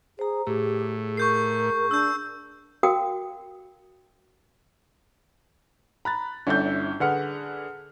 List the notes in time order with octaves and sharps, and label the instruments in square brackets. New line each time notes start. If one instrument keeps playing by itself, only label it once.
[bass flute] G#4 [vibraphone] C5 A#5
[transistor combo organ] A2 [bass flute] G4 [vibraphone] G#4
[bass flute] A#4 [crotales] C#6 G6 C7
[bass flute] D4 [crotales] E6 G6
[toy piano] F#4 A#4 F5 G5 D#6
[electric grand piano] A#5 F#6 A6 [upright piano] B5
[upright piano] G1 E4 G6 [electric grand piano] C#4 D4 A4
[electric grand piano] D3 B4 C#7 [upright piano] G#4 F#5 F6